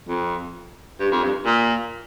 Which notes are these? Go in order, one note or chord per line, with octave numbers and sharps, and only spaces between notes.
F2
G2
F2
G2
A#2